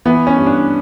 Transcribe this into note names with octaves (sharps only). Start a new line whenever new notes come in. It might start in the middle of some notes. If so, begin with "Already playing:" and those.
E3 B3
C#4
G2
D4